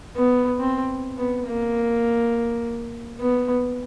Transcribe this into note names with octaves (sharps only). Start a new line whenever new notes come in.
B3
C4
B3
A#3
B3